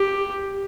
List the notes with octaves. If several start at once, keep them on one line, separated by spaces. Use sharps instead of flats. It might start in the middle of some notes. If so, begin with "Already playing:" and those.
Already playing: G4